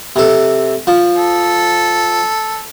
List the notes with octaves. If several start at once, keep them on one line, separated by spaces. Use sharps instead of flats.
C3 A4
F3
A4